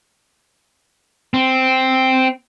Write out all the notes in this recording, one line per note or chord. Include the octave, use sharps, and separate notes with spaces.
C4